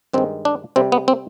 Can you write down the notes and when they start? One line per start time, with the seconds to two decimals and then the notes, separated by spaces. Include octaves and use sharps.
0.13 G2 D#3 G#3 C4
0.45 D4
0.76 C3 G3 C4
0.92 B3
1.08 C4